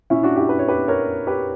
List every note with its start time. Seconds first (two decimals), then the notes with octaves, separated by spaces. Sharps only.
0.10 A#2 C#4 E4
0.23 D4 F#4
0.36 E4 G4
0.49 B4
0.59 C#5
0.68 G4 B4
0.88 A#4 C#5
1.27 G4 B4